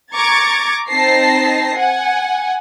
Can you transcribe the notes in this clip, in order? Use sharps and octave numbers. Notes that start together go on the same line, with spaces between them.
A#5 C#6 D6 G#6 A6
C4 D#4 A5 A#6 C7
F#5 G#5